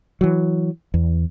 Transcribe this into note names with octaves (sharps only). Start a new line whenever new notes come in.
E3 F#3
E2